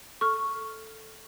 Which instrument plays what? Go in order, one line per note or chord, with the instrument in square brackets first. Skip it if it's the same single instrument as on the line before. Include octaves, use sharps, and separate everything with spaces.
[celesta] A4 [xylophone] C#6 F6